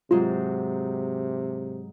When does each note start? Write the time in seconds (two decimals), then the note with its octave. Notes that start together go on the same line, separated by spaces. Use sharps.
0.11 G#2 C3 F#3 F4